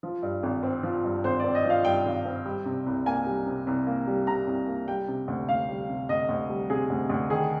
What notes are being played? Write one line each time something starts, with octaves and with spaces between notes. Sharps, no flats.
F3
G2
G#1
C4
F3
G2
G#1 C5
C4 D5
D#5
F3
F5
G2 G5
G#1
C4
G3
C3
C2
A#3 G#5
G3
C3
C2
A#3
G3
C3 A#5
C2
A#3
G3 G5
C3
D2
D2 F5
G3
C3
D2 D#5
D2
G3
C3 G#4
D2
D2
D#3 G#4